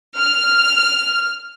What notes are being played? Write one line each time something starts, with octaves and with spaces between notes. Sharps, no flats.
F6